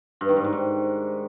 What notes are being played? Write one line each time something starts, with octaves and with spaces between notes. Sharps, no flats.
G2
D#3
G#2
D#3
G#2